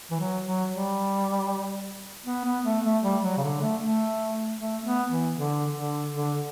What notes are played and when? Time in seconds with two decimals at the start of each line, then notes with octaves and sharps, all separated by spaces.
0.11 E3
0.20 F#3
0.45 F#3
0.71 G3
2.26 B3
2.45 B3
2.65 A3
2.84 A3
3.03 G3
3.24 F#3
3.37 C#3
3.43 D3
3.62 A3
3.81 A3
4.59 A3
4.85 B3
5.11 E3
5.37 D3
5.75 D3
6.15 D3